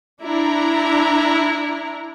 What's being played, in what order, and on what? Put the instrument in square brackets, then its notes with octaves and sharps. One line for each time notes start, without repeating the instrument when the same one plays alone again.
[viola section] D4 E4 A#5